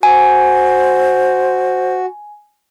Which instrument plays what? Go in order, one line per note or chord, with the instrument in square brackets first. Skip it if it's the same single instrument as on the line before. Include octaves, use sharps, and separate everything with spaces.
[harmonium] F#4 [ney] C5 [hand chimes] G#5